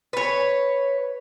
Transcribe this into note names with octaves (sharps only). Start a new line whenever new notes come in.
B4 C#5